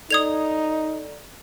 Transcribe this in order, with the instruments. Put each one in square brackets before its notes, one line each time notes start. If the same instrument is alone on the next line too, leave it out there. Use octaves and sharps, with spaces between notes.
[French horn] D#4 [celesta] A4 D5 [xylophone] D#6 G#6 F7